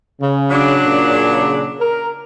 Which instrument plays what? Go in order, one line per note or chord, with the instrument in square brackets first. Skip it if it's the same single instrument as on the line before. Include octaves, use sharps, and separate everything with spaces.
[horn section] C#3
[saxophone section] F#3 D4
[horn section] A#2 C#3
A#4